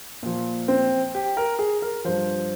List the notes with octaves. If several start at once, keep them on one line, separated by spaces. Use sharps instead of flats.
A#2 F3
C4
G4
A#4
G#4
A#4
G2 F3 C5